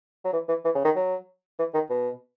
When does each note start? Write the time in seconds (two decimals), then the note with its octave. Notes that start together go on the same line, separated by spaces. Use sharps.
0.25 F#3
0.33 E3
0.48 E3
0.65 E3
0.75 C#3
0.85 D#3
0.96 F#3
1.59 E3
1.74 D#3
1.90 B2